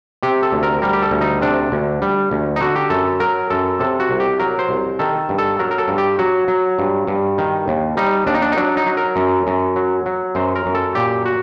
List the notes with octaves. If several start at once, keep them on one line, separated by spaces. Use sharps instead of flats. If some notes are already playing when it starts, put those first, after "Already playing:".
C3 G4
A4
D2
A#4
G3 A#4
G4
A4
D2
D#4
C3 D4
D2
G3
D2
D#4
D3 F#4
G4
F#2 A4
F#3 A#4
F#2 A4
C3 A4
F#4
C2
G4
F#3 A#4
C5
C2
D#3 A4
G2
A4
F#3 A#4
A#4
A4
G2
G4
F#3 F#4
F#3
G2
G2
D#3
D#2
G3 D#4
D#2 D4
D#4
D4
D#4
F#3 D4
D#4
F#3
A#4
F#2
F#2
F#3
F#3
F#2 C5
A#4
F#2
A4
A#2 G4
F#4